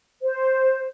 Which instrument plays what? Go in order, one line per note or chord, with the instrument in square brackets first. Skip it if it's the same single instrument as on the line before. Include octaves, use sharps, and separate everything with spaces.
[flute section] C5